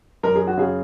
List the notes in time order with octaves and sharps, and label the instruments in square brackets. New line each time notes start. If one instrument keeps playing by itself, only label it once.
[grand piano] F#2 [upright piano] A#4
[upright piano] G#4
F#4
[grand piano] C#3 [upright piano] G#4